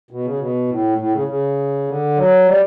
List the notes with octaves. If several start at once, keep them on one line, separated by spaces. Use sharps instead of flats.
B2
C#3
B2
A2
A2
C#3
C#3
D3
F#3
G3